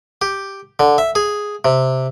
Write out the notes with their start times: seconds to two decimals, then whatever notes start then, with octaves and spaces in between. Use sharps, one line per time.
0.22 G4
0.79 D3
0.98 E5
1.15 G#4
1.65 C3